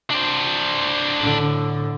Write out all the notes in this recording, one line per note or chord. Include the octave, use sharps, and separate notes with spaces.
D4 C5
A2 D3